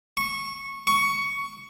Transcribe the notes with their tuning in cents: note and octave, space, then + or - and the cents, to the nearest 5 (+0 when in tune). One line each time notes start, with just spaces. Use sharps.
C#6 -15
C#6 +10